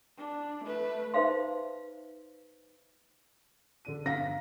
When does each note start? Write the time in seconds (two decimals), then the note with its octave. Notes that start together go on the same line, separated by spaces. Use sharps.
0.18 D4
0.64 A3 B4
1.14 D#4 B4 C5 E5 F5 C6
3.85 D3 D4 D#7
4.06 G1 F5 A#5 A#6 B6